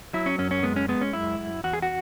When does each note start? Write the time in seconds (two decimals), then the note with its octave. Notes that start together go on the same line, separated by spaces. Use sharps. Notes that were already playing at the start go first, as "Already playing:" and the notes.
0.13 F#3 E4
0.26 C#4
0.38 F#2 C#4
0.51 C#4
0.63 G#3 B3
0.76 C#4
0.88 G#3 B3
1.01 C#4
1.13 F#2 E4
1.39 F#2
1.64 E2 F#4
1.73 G#4
1.82 F#4